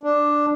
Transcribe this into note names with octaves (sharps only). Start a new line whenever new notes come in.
D4